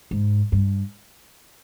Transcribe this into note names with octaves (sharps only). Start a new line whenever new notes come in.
G#2
G2